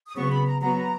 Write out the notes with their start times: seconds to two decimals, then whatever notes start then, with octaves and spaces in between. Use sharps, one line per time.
0.08 D#6
0.16 C#3 F#3 B3 C#6
0.31 B5
0.46 A#5
0.61 F#3 B3 F#4 A#5